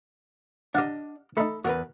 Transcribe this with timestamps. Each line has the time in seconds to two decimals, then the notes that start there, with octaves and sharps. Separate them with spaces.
0.75 D4 G4 D#5 F5 F#5
1.37 A3 D#4 A4 B5
1.65 E2 F#4 A#4 B4